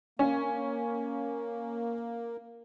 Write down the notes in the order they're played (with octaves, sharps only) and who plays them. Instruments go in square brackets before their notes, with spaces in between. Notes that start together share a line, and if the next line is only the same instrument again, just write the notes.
[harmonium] A#3 [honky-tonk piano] C#4